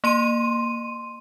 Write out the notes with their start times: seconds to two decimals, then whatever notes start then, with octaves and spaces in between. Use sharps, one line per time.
0.04 A#3 C6 D#7